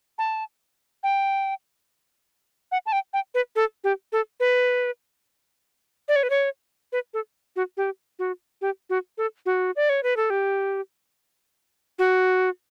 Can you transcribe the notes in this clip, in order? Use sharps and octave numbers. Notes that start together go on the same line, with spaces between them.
A5
G5
F#5
A5
G5
G5
B4
A4
G4
A4
B4
D5
C#5
B4
C#5
B4
A4
F#4
G4
F#4
G4
F#4
A4
F#4
D5
C#5
B4
A4
G4
F#4